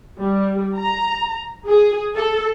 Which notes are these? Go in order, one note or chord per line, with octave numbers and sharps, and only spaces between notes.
G3
A#5
G#4
A4